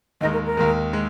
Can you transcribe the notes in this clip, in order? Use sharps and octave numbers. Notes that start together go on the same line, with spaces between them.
D#2 D#3 G#3 D#4 D#5
A#4
A#4
D#2 D#3 G#3
G#3